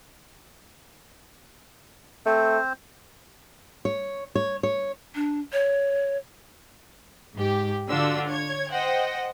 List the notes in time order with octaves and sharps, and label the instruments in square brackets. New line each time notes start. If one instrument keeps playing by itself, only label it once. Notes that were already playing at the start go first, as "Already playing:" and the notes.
[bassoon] A3 [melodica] C4 C5
[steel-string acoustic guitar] C#5
C#5
C#5
[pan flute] D4
C#5
[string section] G#2 G4
D3 D4 F4 F#4 E6
C#5 G#6
C5 D#5 F#5 G5